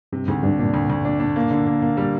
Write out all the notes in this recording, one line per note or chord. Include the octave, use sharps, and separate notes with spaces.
G2 C3
D2 G#2
G2 D4
A#2 D4
D2
D2
D4
D4
A#3
D3
A#3
A#3
G3